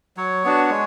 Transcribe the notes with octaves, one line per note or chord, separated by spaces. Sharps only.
F#3 C#5
B3 D4 F#4
G#3